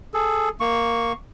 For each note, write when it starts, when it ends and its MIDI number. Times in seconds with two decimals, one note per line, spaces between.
0.14 0.49 68
0.14 0.49 69
0.60 1.13 58
0.60 1.13 85